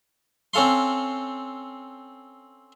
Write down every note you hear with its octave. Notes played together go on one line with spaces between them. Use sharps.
C4 C#4 A4 F5 C6